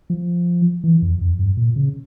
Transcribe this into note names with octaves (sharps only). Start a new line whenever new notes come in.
F3
E3
F2
F2
G2
A#2
C#3